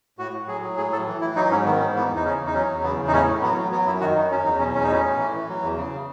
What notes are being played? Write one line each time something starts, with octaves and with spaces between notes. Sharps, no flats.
A2 F#4
A2
F#3 G#4
F#3
A2 G#4
A2 A4
E3
E3 E4
F#3 D#4
G#2 C#4
D#3 B3
G#2 C#4
E3 B3
E2
D#4
C#3 C#4
E2
D#4
F#3 C#4
E2
C#3 B3
E2
D#4
A2 C#4
A2
F#3 B3
F#3
F#3 B3
F#2 E4
D#3 F#4
F#2 D#4
F#3 C#4
E2 D#4
B2 C#4
E2 C#4
D#4
A2 C#4
A2
E3
E3
F#3
E2
C#3